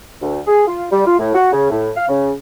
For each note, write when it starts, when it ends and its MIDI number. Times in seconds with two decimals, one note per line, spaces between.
0.21 0.39 38
0.47 0.66 68
0.67 0.85 65
0.91 1.04 55
1.05 1.17 65
1.19 1.33 45
1.35 1.49 66
1.52 1.69 49
1.70 1.90 45
1.96 2.08 77
2.08 2.31 49